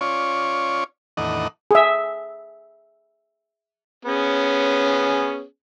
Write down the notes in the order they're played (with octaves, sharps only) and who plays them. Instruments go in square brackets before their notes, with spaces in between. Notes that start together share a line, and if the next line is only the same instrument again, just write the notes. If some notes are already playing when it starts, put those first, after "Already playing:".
[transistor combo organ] C#4 F4 C#5 D5
E2 A2 D#3 D4 D#5 F#5
[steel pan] G#4 E5
[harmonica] B3 C#4 G#4